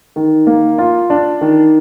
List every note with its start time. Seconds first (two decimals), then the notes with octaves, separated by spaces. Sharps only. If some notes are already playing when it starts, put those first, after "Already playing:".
0.16 D#3
0.47 A#3
0.78 F4
1.10 D4
1.41 D#3